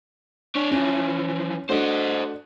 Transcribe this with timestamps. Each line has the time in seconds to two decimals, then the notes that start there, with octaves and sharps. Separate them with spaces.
0.56 D4 C#5
0.72 E3 F3 C#4
1.69 A3 D4 F#4 C5 D#5